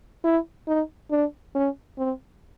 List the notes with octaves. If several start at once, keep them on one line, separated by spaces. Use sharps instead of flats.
E4
D#4
D4
C#4
C4